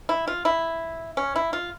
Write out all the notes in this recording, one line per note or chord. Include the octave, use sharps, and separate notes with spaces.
E4
F4
E4
C#4
E4
F4